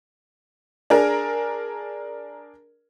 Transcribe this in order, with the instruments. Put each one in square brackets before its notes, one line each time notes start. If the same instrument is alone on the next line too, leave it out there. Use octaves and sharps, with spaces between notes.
[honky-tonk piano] D4 G#4 A#4